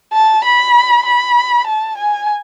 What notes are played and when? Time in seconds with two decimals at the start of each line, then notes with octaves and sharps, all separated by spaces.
0.13 A5
0.44 B5
1.06 B5
1.67 A5
1.97 G#5